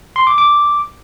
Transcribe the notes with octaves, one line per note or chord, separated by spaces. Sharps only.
C6
D6
D6